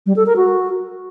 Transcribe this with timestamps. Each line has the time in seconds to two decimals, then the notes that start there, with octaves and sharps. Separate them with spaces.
0.06 G3
0.16 A4
0.26 A#4
0.36 F#4